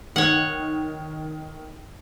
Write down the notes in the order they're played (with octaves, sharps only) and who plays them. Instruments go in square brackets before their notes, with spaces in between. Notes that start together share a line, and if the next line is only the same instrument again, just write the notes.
[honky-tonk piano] D#3 [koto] C#5 F#5